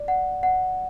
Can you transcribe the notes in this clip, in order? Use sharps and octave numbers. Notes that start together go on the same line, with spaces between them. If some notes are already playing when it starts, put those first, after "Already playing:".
Already playing: D5
F#5
F#5